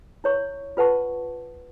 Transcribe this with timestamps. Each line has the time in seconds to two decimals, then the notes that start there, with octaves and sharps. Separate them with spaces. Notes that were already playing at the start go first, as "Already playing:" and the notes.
0.24 E4 C#5 C#6
0.77 F4 B4 F#5 A5 C#6